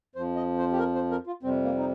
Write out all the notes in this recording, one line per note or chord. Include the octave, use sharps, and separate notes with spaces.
F2 F3 C5
D#5
C5
G4
A#4
C5
A#4
F4
F2 C3 G3 C4
A#3
D#4